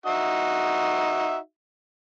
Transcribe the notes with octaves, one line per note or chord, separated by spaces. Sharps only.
D#4 F#4 E5